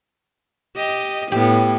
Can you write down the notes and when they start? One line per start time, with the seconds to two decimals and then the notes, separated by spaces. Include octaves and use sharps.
0.76 G4 D#5
1.32 A2 B3 G4